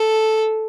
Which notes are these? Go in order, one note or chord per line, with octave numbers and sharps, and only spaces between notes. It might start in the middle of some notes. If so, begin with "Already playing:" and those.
Already playing: A4